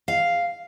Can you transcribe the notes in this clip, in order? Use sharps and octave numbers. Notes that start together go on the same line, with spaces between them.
F5